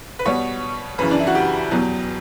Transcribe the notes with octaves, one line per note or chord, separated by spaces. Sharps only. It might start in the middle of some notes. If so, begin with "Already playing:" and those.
B4
B2 G3 B3 C#5
F#2 C#3 E3 B4
D4
E4
F#4
G4
E2 B2 F#3